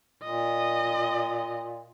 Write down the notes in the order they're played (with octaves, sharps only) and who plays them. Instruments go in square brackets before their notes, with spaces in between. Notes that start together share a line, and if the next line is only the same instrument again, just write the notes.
[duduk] A#2 [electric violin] D#5